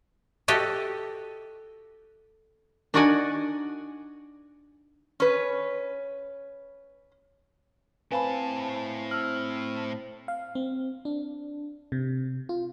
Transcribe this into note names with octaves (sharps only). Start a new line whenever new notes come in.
F#4 G4 A4 D#5
D4 D#4 F#4 D5 F#5 G#5
C#4 B4
A2 C4 B4 F5 G#5 A5 B5
E6 F6 F#7
F5
C4
D4
C3
F4